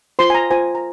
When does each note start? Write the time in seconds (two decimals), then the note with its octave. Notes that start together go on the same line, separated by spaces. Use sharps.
0.19 F4 C5 C6
0.30 G#5
0.34 A#5
0.51 F4 C5 G#5
0.75 A#5